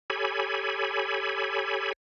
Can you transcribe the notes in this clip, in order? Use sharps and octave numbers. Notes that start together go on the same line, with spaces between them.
G4 A4 C#5 G#5 B5